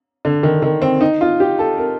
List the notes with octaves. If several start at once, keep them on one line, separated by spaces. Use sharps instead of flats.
D3
D#3
D#3
C4
D#4
F4
G4
A4
A#4